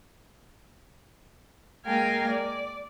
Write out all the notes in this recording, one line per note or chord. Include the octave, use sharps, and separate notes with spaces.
G#3 A#3 A#4 F5 G5 G#5
D5